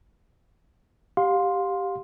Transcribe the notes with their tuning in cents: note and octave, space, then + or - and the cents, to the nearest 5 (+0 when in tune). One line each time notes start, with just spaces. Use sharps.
G4 +0 F5 +25 C6 +0